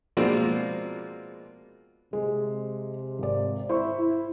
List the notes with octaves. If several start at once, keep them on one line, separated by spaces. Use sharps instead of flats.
B2 F3 G#3 A#3 C4 D4
C3 G#3
G#1 D5
E4 C5 C#6
E4